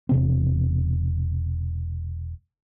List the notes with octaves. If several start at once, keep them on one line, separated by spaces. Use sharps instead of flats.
E1 C3 C4